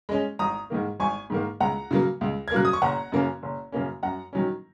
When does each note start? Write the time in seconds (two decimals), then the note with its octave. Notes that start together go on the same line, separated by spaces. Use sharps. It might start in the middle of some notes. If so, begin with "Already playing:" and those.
0.09 G#3 C#4
0.39 G#1 A#5 D#6
0.70 G#2 D#3 A#3
1.00 G#1 G#5 C#6
1.30 G#2 D#3 A#3
1.60 C#2 F#5 A#5
1.91 C#3 F#3 A#3
2.21 C#2
2.48 G#6
2.51 C#3 F#3 A#3 F#6
2.65 D#6
2.73 C#6
2.82 F#1 F#5 A#5
3.12 F#2 C#3 A#3 C#4
3.43 F#1
3.72 F#2 C#3 A#3 C#4
4.03 F#2 F#5 A#5
4.33 D#3 F#3 C#4